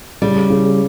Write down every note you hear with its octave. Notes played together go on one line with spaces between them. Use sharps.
C#3 G3
C#3